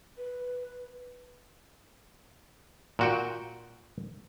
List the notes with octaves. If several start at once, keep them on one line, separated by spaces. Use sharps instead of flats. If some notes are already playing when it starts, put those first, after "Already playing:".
B4
A#2 F#4 G5